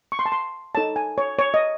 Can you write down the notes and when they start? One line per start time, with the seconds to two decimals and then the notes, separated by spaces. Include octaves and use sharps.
0.12 C#6
0.19 C6
0.26 A5
0.32 C6
0.75 D#4 A4 C#5 A5
0.96 G#5
1.18 C#5
1.39 C#5
1.54 D#5